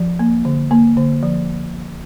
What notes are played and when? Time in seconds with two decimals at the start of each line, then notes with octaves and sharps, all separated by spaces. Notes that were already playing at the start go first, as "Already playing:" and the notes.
Already playing: F3
0.19 A#3
0.45 D3
0.71 A#3
0.97 D3
1.23 F3